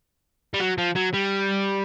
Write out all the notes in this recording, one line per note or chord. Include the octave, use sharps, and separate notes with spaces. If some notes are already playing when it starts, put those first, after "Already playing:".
G3
F#3
F3
F#3
G3